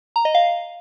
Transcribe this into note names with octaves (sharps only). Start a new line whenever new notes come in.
A#5
D#5
F5